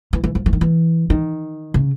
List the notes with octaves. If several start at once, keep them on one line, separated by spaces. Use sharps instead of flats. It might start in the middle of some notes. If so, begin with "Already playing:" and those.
E3
E3
F3
E3
D#3
E3
D#3
C#3